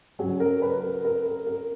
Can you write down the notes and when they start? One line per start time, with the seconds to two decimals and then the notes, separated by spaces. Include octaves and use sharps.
0.19 C#3 F#3 G#4
0.40 A#4
0.62 B4
0.83 A#4
1.05 A#4
1.26 A#4
1.47 A#4